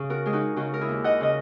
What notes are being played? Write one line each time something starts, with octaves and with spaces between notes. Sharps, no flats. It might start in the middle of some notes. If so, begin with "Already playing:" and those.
Already playing: C#3 G#4
F#4 A#4
G#3 G#4
D#4 F#4
C#3 D#4 F#4
A#4
E4 G#4
D#2
D#5 F#5
C#3 D#5